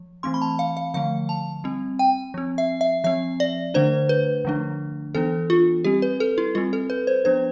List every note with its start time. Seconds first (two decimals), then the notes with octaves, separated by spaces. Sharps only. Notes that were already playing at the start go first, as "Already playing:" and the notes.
Already playing: F3
0.23 E3 A3 C4 C6
0.34 B5
0.42 A5
0.59 F5
0.77 F5
0.94 D3 F3 A3 F5
1.29 A5
1.64 G3 C4
1.99 G5
2.34 F3 C4
2.58 E5
2.81 E5
3.04 F3 C4 E5
3.40 D5
3.74 D3 A3 D4 C5
4.09 B4
4.45 D3 F3 A3 D4
5.15 E3 B3 D4 A4
5.50 F4
5.84 G3 C4 G4
6.02 B4
6.20 A4
6.38 E4
6.55 G3 C4 F4
6.73 A4
6.90 B4
7.07 C5
7.25 F3 B3 D4 C5